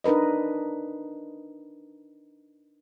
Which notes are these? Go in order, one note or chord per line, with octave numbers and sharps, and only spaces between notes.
D4 D#4 A#4 B4 D#5